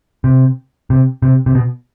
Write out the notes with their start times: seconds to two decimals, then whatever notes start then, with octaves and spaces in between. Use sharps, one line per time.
0.24 C3
0.90 C3
1.22 C3
1.46 C3
1.55 B2